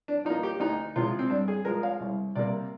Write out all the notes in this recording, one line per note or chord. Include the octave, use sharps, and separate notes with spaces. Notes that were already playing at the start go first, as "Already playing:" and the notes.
D4
F3 D#4
A#3
G4
D2 D#4
C3 F3 G#3 F4
C4
G2 D4
G#4
F3 G#3 A#4
F5
C2
C3 G3 A#3 D5